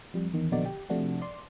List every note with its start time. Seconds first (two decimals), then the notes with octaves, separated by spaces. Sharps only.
0.14 F2 G3
0.34 E2 D#3
0.52 A#1 B2 D3 D#4 F#4 D5
0.66 G4
0.90 C3 F3 A3 D4 F#4
1.22 D5 C6